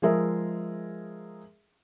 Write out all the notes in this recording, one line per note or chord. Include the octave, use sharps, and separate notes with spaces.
F3 G#3 G#4 A#4 E5